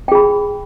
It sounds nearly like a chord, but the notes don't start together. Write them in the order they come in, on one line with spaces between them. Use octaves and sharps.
G5 G#4 B5